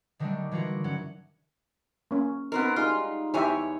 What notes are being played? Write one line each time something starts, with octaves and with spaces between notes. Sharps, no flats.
D3 D#3 F#3 G3 A3 D4
D3 E3 F4 F#4 A#4
G2 F#3 C#4 F#5
A#3 C#4
B3 C4 D#4 F#4 A#4
G3 G#3 D#4 F4
E2 E4 G4 C#5 E5 G#5